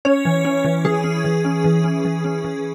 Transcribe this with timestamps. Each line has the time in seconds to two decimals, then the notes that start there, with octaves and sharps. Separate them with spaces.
0.05 C#4 C#5
0.25 E3
0.45 C#4
0.65 E3
0.85 E3 G#4
1.04 C#4
1.24 E3
1.45 C#4
1.64 E3
1.84 C#4
2.05 E3
2.24 C#4
2.44 E3